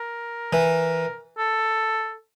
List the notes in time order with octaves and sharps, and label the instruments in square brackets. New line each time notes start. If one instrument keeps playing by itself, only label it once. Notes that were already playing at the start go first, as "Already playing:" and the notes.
Already playing: [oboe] A#4
[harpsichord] E3
[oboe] A4